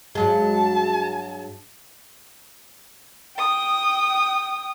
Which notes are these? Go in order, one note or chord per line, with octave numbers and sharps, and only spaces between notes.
G2 F#3 G#3 A5
G5 D#6